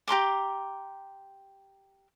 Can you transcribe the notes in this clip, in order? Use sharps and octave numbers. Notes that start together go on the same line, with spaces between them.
G4 A#5 C6 D6